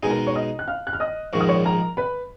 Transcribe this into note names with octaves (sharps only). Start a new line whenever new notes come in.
B2 G#3 D#4 G#4 G#5
A#4 A#5
C#5 C#6
D#5 D#6
F#6
F5 F6
F#6
F6
D#5 D#6
A#1 G#2 D#3 G#3 C#6
D#6
C#5 C#6
A#4 A#5
B4 B5